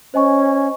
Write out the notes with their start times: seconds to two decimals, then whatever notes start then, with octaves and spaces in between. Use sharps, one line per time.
0.14 C#4 C5 D#5 G#5 C#6